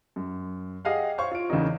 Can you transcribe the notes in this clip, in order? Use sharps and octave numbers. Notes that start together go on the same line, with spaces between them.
F#2
G4 G#4 D#5 F5 F#5
C5 C#5 F5 C6 C#6
F4 D7
E2 C#3 A#3 C#4 D#4